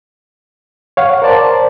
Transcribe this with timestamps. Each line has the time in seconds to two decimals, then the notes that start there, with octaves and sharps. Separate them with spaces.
0.97 C#5 F5 F#5
1.22 A#4 C5 D5 A5